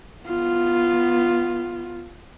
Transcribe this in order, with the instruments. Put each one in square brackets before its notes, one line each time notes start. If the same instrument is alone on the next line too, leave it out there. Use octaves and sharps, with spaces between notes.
[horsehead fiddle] B3 F4